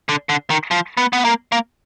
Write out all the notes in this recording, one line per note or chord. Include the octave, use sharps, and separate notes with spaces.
D3
D3
D#3
F3
B3
B3
A#3
A#3